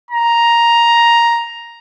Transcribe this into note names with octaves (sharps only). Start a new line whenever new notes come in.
A#5